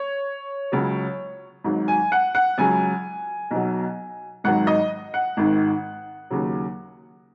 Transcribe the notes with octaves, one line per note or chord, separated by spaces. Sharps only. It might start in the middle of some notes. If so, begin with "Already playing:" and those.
Already playing: C#5
C#2 C#3 F#3
G#1 G#2 F#3
G#5
F#5
F#5
C#2 C#3 F#3 G#5
B1 B2 F#3
G#1 G#2 D#3 F#3 F#5
D#5
F#5
G#1 G#2 D#3
D#2 C#3 F#3